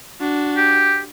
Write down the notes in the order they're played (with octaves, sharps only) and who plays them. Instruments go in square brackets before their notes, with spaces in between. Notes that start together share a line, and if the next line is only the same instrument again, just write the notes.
[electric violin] D4 F#4
[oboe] G4